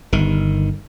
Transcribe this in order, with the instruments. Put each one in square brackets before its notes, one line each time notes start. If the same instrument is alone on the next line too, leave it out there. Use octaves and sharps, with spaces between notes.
[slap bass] G1 D#3